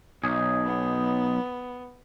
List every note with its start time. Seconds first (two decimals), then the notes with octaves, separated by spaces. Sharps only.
0.24 B1 D#4 G#4
0.66 B3